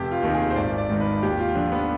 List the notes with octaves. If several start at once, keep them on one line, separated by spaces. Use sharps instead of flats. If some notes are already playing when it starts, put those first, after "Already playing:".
Already playing: F1 G4
F4
D#2 D#3
G#4
C5
G#1 D5
D5
G#2 D#3
B4
D#2 G4
F4
D3 F3 D4
B3